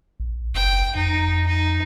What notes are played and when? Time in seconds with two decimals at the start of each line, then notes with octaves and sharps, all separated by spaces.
0.20 A#1
0.55 F#1 G5
0.95 F2 D#4
1.46 D#4